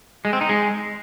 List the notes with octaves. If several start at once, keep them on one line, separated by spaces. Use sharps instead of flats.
G#3
C4
D#4
G#3